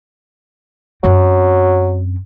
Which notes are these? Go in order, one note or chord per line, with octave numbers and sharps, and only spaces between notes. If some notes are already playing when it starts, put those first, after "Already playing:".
F#2 F#3 C4